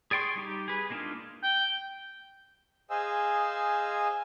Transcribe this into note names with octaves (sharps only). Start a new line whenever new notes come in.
G#4 D5 G5 C6 C#6
G3 D#4 G4
G#4 B4
G#3 A#3 D4 D#4 F4
G5
G#4 C5 D#5 F5 G#5 E6